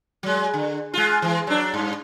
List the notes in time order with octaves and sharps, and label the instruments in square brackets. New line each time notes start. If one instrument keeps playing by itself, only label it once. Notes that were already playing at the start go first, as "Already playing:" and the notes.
[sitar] F#3 G#3
D3
G#3 F4
E3 G#3
F#3 D4
G2